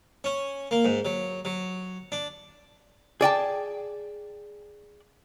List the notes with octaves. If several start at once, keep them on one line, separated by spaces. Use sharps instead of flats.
C#4
A#3
G#2
F#3
F#3
D4
G#4 D5 G5 A5